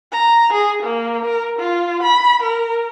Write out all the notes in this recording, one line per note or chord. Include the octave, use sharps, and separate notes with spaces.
A#5
G#4
A#3
A#4
F4
B5
A#4